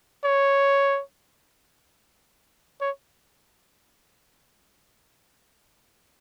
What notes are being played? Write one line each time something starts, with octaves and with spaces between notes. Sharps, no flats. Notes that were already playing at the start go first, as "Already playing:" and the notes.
C#5
C#5